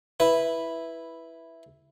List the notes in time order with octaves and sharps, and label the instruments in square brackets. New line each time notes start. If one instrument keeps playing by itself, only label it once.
[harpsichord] E4 B4